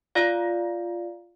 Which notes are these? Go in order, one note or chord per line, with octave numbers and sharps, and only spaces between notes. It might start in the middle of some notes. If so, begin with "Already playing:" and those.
F4 D5 F5